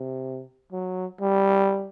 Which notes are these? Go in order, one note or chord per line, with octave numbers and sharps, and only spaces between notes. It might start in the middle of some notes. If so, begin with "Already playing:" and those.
Already playing: C3
F#3
G3